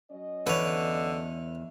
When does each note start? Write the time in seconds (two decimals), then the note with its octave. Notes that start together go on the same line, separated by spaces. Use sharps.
0.11 F#3 C#4 D#5
0.47 E2 D3 B4 C#5